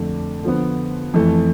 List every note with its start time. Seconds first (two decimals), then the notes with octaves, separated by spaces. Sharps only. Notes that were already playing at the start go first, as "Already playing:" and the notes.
Already playing: F2 D3 A3 D4
0.43 D3 F3 B3
1.14 F2 E3 A3